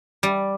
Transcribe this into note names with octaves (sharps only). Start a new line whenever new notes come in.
G3